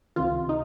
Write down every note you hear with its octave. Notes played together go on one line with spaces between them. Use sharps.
C#2 C3 D#3 F4
D#4